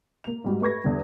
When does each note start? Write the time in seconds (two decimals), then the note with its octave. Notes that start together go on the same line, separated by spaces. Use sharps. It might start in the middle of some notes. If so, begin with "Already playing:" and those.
0.24 A#3 F7
0.44 G#2 G3 F#4
0.61 A3 B4 C#6 G#6 A#6
0.84 E2 D3 G3